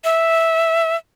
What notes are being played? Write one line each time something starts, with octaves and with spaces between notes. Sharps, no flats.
E5